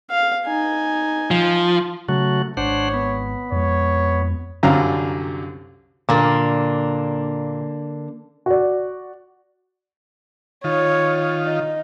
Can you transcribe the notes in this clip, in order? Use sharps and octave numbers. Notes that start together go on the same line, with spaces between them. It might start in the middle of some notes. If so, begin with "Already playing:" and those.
F5
D#4 G#5
F3
C#3 F#3 A3 F#4
G#1 D4 C5 C#5 F#5
B3
F2 G#3 C#5
C2 F#2 D3 F5 A#5
A#2 D3 A#3 D4
F#4 D5
D#3 F4 C#5
D#4